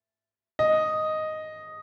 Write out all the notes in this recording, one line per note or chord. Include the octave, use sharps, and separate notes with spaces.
D#5